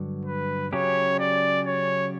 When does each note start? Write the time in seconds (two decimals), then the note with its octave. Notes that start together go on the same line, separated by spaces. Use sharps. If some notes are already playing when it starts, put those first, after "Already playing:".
Already playing: G2 D3 F#3
0.26 B4
0.73 C#3 F#3 C#4 G4 C#5
1.19 D5
1.67 C#5